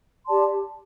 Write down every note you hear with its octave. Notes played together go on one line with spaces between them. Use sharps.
G4 D5 A5 C6